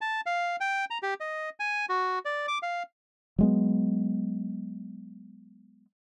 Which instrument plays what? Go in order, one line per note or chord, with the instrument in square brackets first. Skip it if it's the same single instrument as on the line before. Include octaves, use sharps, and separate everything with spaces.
[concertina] A5
F5
G5
A#5
G4
D#5
G#5
F#4
D5
D6
F5
[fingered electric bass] F#3 G#3 B3